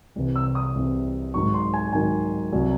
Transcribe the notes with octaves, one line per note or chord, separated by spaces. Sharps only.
C2 C3 E3
E6
D#6
C2 C3 E3
G#2 D#3 F#3 C#6
C6
G#5
G#2 D#3 F#3 G#5
C2 C3 F#3